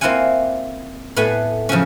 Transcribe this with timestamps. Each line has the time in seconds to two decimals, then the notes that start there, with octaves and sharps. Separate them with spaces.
0.01 A#3 C4 E4 F4 F#5 G#5
1.16 A2 A3 B3 B4 F#5 G#5
1.69 C#3 F3 F#3 C#4